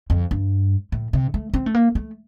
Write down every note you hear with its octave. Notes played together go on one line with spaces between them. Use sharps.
F2
G2
A2
C3
A3
C4
A3
A#3
A3